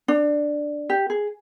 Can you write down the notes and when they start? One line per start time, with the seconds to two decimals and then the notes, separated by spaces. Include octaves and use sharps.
0.08 D4
0.90 G4
1.10 G#4